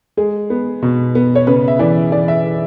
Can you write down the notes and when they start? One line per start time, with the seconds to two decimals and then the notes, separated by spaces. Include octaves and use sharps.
0.17 G#3 G#4
0.50 B3
0.82 B2
1.15 B3
1.35 C#5
1.47 C#3 B4
1.68 E5
1.79 E3 D5
2.12 E3 D5
2.28 E5